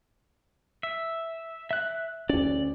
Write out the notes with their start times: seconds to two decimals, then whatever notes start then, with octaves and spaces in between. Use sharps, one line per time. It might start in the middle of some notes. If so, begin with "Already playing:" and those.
0.83 E5
1.71 E5 F#6
2.29 D2 C#4 D5